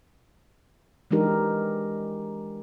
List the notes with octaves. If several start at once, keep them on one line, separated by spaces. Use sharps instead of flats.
E3 G#3 D4 D#4 G4 A#4